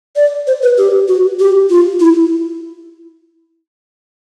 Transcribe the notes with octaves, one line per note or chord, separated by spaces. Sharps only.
D5
C5
B4
G4
F#4
G4
F4
E4